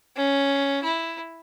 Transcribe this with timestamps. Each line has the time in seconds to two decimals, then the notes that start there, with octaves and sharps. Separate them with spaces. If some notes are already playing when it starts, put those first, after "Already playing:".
0.17 C#4
0.83 E4